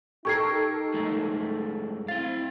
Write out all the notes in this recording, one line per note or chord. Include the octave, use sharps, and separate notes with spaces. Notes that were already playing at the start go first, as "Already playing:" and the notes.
D#4 G4 A4 A#4 C#6 G#6 C7
F#2 G#3 A3
C4 E4 F5 A6